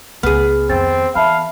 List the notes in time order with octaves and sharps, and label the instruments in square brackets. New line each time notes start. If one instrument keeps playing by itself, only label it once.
[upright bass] C#2 [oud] B3 G#4 [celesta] F6
[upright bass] F2 D#3 [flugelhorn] C4 [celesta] A6
[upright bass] E3 [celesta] E5 A5 B5 [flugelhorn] F5